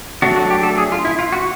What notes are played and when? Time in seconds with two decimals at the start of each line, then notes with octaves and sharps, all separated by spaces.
0.22 F#3 A3 D4 F#4
0.36 F#4
0.50 G4
0.63 A4
0.78 G#4
0.92 F4
1.05 E4
1.19 F4
1.32 F#4